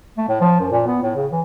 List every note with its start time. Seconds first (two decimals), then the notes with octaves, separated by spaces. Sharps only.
0.17 A3
0.29 A2
0.41 F3
0.60 F#2
0.71 A#2
0.87 B3
1.02 A2
1.16 C#3
1.31 E3